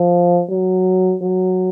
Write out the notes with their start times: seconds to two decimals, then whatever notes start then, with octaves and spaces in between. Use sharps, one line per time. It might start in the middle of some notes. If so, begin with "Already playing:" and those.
Already playing: F3
0.50 F#3
1.23 F#3